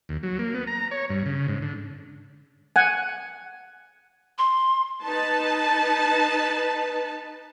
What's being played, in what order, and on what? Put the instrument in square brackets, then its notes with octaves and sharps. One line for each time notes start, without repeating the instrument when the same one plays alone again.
[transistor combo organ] D#2
F#3
A#3
B3
A#5
C#5
G2
C#3
G#2
D3
[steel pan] F#5 G#5
[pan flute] C6
[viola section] D#4 B4 A5